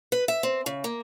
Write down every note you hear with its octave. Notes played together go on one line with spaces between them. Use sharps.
B4
E5
C4
C#3
A#3